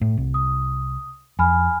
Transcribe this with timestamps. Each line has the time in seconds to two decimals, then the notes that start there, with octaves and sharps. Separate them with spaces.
0.01 A2
0.17 C2
0.34 D#6
1.39 F2 G#5 B5 F6